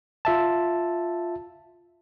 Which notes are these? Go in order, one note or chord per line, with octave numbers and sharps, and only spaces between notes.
F4 E5 A5